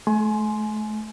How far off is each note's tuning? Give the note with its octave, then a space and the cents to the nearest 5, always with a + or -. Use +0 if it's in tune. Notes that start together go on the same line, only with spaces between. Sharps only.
A3 -35 G#5 +25 C6 +0